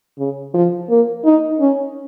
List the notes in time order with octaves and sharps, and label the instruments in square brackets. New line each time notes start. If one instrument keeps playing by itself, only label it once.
[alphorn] C#3
F3
A#3
D#4
C#4